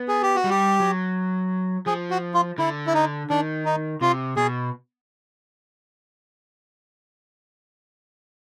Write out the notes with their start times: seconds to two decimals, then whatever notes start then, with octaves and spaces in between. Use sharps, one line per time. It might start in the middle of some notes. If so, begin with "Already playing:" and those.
Already playing: B3
0.08 G#4
0.22 G4
0.36 F#4
0.44 G3
0.50 G4
0.80 F#3
1.86 F3 G#4
2.11 F#4
2.34 F4
2.58 D3 E4
2.87 E4
2.94 D#4
3.30 D#3 D4
3.65 D#4
4.01 C3 F4
4.36 B2 G#4